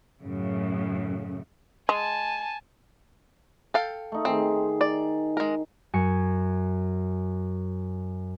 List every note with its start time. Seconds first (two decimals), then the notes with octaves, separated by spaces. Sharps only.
0.23 F#2 A2 C#3
1.89 G#3 G#5 A5
3.74 A4 F5 G5
4.12 A3 D#4
4.25 D#3 C4 G#4
4.81 D5
5.37 G#3 A#4
5.93 F#2 G#5 C#7